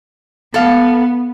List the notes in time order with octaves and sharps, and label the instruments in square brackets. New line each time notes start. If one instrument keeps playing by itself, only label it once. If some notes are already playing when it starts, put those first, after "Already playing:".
[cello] B3 [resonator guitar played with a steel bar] A4 F5